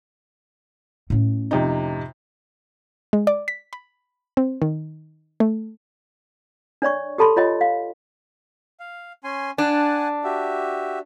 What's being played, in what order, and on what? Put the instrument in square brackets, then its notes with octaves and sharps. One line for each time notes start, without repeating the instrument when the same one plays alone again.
[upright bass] A2 C#4
[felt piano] F2 C3 D#4
[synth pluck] G#3
D5
B6
B5
C4
D#3
A3
[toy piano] D4 C#5 D5 C#6
G4 A4 A5 B5 C6
F4 C#5 D#5 G5
F5
[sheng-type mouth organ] F5
C#4 G#5 C6
[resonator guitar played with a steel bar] D4 [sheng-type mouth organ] F#5 G#5 A5
[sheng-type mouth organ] F#4 G4 E5